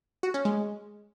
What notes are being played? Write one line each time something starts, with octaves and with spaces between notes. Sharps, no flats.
F#4
C#4
G#3